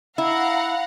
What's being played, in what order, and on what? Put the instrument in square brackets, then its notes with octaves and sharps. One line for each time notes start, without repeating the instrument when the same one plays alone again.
[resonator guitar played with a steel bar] E4 [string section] F5 F#5 A#5